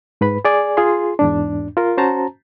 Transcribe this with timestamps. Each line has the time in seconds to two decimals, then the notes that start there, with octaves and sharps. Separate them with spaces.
0.21 G#2 B4 B5
0.45 G#4 D5 G#5
0.77 F4 G#4 C6
1.19 E2 G#2 D4
1.77 F4 A#4
1.97 C#4 F#4 C5 A5 A#5